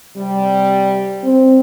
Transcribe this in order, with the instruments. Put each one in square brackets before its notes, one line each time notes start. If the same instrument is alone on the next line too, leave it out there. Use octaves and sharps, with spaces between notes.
[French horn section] C3 G3
[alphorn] C4